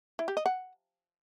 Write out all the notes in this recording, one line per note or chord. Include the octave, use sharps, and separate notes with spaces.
E4
G4
D#5
F#5